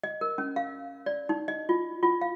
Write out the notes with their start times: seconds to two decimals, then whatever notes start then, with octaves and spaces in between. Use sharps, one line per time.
0.03 D#5
0.21 A#4
0.38 C#4
0.56 F5
1.06 D5
1.29 D#4
1.48 D#5
1.69 F4
2.03 F4
2.21 F5